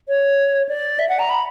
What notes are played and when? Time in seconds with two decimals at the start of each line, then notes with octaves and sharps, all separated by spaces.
0.08 C#5
0.69 D5
0.99 E5
1.09 F#5
1.19 A#5
1.30 B5